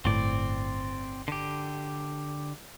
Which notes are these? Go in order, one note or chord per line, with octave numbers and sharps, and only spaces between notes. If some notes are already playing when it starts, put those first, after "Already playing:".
G1 A2 C4 D5
D3 G4